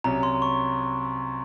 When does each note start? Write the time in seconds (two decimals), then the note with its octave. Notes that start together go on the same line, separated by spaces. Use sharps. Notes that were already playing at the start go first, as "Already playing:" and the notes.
0.04 C2 C3 F#3 C#4 A#5
0.23 C6
0.42 C#6